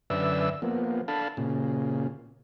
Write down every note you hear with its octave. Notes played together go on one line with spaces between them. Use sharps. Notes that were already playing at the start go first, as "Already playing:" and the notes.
F#2 D3 B4 D5 E5 E6
F3 A#3 B3
D4 A4 F5 A5 B5
A#2 C#3